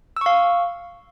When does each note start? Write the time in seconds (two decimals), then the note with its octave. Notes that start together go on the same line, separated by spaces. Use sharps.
0.17 E6
0.21 C#6
0.26 F5